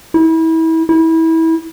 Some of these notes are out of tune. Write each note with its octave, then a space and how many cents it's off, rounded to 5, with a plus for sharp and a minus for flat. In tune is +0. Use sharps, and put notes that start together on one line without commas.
E4 -30
E4 -25